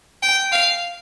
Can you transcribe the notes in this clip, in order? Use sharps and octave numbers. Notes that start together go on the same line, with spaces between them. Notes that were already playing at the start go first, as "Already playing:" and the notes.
G5
F5